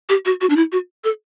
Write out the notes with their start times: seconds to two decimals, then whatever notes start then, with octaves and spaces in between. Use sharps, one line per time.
0.09 G4
0.25 F#4
0.41 F#4
0.50 D4
0.56 E4
0.72 F#4
1.04 A4